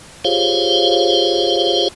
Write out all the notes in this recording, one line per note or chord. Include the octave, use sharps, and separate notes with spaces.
F4 G4 G#4 C5 C#5 F5